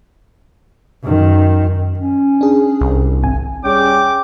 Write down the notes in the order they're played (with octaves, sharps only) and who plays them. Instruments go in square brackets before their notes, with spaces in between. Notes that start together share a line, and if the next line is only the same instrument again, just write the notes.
[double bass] F#2 D#3
[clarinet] C#4
[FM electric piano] D4 G#4
[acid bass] C2
[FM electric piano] G#1 G#5 [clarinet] C4
[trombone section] G3 C#4 G#4 [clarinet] G5 [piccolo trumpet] D6